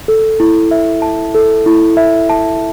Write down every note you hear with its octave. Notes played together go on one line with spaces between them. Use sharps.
A4
E4
E5
A5
A4
E4
E5
A5